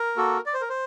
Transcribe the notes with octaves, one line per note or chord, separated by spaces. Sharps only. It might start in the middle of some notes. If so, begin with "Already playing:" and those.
Already playing: A#4
A#3 F#4 A4
D5
C5
A#4
C5